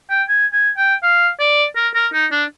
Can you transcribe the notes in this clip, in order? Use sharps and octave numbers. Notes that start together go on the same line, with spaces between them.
G5
G#5
G#5
G5
F5
D5
A#4
A#4
D#4
D4